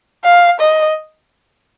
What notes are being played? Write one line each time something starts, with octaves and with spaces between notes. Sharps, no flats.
F5
D#5